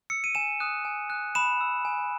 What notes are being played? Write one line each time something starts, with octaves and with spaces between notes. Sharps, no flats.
E6 C#7
D#7
G#5 E7
D#6 F#6
G#5
D#6 F#6
B5 E7
E6
G#5